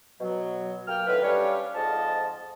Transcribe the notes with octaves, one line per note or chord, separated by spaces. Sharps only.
B2 F#3
A#3 G5 F6
A2 D3 D#3 B4
G3 C#4 D4 G4 C#5 F5
F2 G#2 F3 D#5 A5